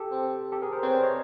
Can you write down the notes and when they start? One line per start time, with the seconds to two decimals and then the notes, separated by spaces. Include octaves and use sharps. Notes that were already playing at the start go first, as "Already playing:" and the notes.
Already playing: G4 A4
0.11 C4
0.52 G4 A4
0.62 G#4 A#4
0.73 A#4 C5
0.83 C4 B4 C#5
0.93 C5 D5
1.03 C#5 D#5